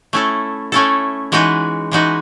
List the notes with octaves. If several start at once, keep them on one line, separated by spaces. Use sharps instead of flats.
A3 C#4 E4 A4
A3 C#4 E4 A4
E3 G#3 D#4 F#4 B4
E3 G#3 D#4 F#4 B4